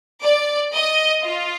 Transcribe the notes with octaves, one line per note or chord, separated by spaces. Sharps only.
D5
D#5
F4